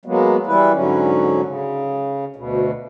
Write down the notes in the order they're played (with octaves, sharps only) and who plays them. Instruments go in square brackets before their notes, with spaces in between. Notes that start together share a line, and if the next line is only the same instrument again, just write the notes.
[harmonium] F#3 G#3 A#3 B3
E3 G3 E4 B4
G#2 D3 F#3 C#4
C#3
D2 B2